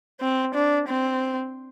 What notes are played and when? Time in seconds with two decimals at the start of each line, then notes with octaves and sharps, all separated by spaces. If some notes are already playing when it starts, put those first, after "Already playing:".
0.21 C4
0.54 D4
0.89 C4